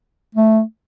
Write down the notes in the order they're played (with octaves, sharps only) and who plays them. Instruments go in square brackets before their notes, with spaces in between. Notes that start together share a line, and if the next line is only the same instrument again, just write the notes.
[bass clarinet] A3